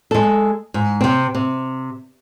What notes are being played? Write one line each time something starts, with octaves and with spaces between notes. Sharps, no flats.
G#3 A4
G#2
C3 C4
C3